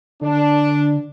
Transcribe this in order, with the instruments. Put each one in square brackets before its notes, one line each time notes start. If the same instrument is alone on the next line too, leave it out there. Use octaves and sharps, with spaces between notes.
[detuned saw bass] D3 [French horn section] D4